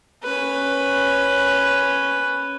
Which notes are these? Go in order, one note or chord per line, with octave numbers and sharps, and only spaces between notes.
C#4 B4